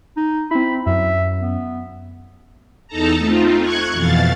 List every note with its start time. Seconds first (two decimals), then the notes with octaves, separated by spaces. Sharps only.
0.17 D#4
0.51 C4 E4 B5
0.86 F#2 E5
1.41 B3
2.87 E2 D#4 A4 A5 A#5
3.17 A3 C4 D#4 F4
3.60 C#6 F#6 G#6
3.92 F2 B2 E3 F5 A6